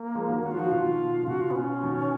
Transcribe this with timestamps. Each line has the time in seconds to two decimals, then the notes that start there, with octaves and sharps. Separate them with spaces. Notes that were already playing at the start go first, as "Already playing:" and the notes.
Already playing: A#3
0.15 F3 G#3
0.28 D#3 F#3
0.43 D#3 F#4
0.51 F4
0.57 F3 F#4
0.70 B2 D#3 F4
1.23 C#3
1.27 B2 F#4
1.41 F4
1.51 B3
1.56 C#4
1.83 B2 D#3